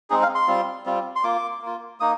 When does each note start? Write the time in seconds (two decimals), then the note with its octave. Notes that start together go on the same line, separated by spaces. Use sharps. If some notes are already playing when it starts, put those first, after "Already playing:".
0.10 G#3 C4 D#4 G#4
0.23 F5
0.35 C6
0.48 G3 C4 F4
0.86 G3 C4 F4
1.16 C6
1.23 A#3 F4 D6
1.61 A#3 F4
2.00 A#3 D#4 D#6